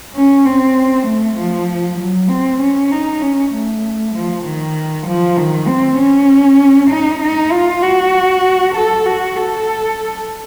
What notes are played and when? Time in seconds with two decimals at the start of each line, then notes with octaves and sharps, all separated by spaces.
0.15 C#4
0.46 C4
1.07 A3
1.38 F3
2.00 F#3
2.30 C4
2.61 C#4
2.91 D#4
3.22 C#4
3.53 A3
4.15 F3
4.45 D#3
5.07 F3
5.37 D#3
5.68 C4
5.98 C#4
6.90 D#4
7.22 D#4
7.52 F4
7.82 F#4
8.75 A4
9.06 F#4
9.36 A4